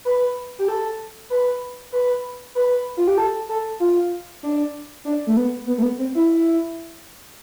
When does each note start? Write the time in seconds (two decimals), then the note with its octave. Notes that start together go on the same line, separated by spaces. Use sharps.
0.05 B4
0.59 G4
0.68 A4
1.30 B4
1.92 B4
2.55 B4
2.97 F4
3.08 G4
3.18 A4
3.49 A4
3.80 F4
4.43 D4
5.05 D4
5.27 A3
5.37 B3
5.67 B3
5.78 A3
5.82 B3
5.99 C4
6.15 E4